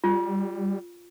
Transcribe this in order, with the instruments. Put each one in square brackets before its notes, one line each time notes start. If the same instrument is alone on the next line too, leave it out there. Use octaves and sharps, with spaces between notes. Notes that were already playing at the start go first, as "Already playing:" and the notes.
[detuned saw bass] G3 [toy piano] F4